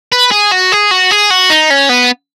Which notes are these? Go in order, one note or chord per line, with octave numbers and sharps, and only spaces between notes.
B4
G#4
F#4
G#4
F#4
G#4
F#4
D#4
C#4
B3